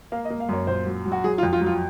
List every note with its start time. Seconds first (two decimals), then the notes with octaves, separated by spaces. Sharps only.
0.12 A#3 F5
0.25 D#5
0.30 A#3
0.40 F5
0.49 F#2 C#5
0.67 A#2 C5
0.86 F#3
1.05 F#3
1.12 F#4
1.24 F#3 G#4
1.38 F4
1.43 F2
1.53 F4
1.61 F#3
1.66 F4